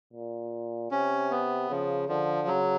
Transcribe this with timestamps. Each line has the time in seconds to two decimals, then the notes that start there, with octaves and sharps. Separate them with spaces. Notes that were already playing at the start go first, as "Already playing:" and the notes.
0.13 A#2
0.91 C3 C#4
1.31 B3
1.70 C#3 F3
2.09 D3 F3
2.47 C#3 F#3